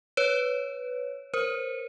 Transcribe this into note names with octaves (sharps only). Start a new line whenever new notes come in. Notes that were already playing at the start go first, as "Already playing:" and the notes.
B4 C#5
A#4 C5